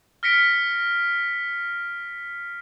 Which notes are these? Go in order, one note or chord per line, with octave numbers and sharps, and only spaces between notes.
F6 A#6 B6 C#7 D7